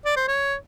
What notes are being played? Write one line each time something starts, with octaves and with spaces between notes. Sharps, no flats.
D5
C5
C#5